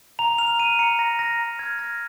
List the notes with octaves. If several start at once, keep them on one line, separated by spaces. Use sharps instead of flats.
A#5 F7
F6 F7
F6 D#7
A#5 C#7
A#5 A#6
F6 A#6
A#5
F6 G#6
F6 A#6